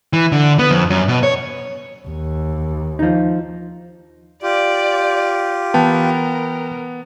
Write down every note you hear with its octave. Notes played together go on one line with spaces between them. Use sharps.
E3
D3
B3
F2
F#2
B2
C#5
D#2
F3 D#4
F4 G4 D5
E3 B3 A#4 G5 A5